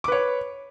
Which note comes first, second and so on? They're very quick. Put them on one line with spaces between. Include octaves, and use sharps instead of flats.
D6 B4 C#5